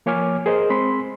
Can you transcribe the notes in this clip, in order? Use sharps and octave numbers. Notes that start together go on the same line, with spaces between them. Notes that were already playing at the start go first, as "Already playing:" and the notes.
F3 A#3 C#5 G#5 D6 F6
G#4 A#4 C5 D#5
G#3 C4 B5 C6